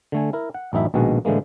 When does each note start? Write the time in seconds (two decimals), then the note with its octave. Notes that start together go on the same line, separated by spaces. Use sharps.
0.12 D3 A3 G#5
0.33 E4 A#4
0.54 F#5
0.73 A1 F#2 D#4 E4 E5
0.94 A#1 B2 D#3 G#3 F#4 F#5
1.25 A2 D3 E3 G#3 A#3